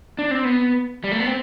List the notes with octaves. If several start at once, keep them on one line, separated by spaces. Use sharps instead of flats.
D4
C4
B3
G3
A3
B3
C4